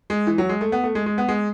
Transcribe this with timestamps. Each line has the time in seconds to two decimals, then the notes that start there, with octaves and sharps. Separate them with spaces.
0.10 G#3
0.27 E3
0.38 F#3
0.49 G#3
0.61 A3
0.72 B3
0.84 A3
0.95 G#3
1.06 G#3
1.18 B3
1.28 G#3